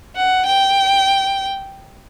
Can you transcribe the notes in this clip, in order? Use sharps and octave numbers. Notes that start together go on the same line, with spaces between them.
F#5
G5